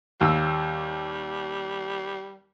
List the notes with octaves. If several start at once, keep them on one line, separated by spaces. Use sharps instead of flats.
D#2 G3 E6